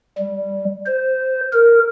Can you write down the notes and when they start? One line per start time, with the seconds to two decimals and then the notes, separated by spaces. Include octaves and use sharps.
0.18 G3
0.86 C5
1.53 A#4